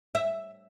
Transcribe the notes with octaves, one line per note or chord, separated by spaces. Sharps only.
E5